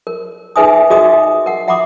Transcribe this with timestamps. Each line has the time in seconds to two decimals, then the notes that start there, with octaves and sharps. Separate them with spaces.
0.07 A#4
0.56 D#4 G#4 B4 E5 G#5 D#6
0.90 F#4 G#4 A#4 D#5 E5 D#6
1.46 A#4 F#5
1.68 E5 F#5 B5 C6 D6 D#6